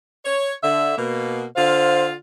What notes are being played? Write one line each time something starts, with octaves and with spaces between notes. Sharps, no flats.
C#5
D3 E5
B2 A#3
D3 F4 C5 F5